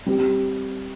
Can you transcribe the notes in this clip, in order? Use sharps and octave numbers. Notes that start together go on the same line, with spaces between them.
G3 C4 G4